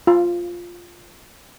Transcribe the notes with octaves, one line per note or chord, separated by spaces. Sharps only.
F4